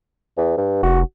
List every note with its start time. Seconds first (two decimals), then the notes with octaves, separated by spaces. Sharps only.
0.37 E2
0.57 G2
0.83 F1 F#4